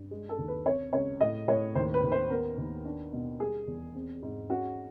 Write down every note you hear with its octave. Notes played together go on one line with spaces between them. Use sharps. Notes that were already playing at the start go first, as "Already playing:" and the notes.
Already playing: G2
G#3
A4
D#2
B4
C4 C#5
C#2 C#5
A2 D#5
A2 C#5
D#2 C5
B4
D#2
C5
B3 A#4
D#2
D4
B2
G3 G#4
E2
C4
G#2
C#4 F#4